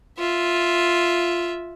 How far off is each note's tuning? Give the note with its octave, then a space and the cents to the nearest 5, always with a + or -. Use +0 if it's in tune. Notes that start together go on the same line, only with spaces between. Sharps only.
F4 +0 E5 +0